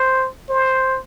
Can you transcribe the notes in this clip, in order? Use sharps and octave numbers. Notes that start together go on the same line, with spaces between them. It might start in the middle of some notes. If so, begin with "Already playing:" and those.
Already playing: C5
C5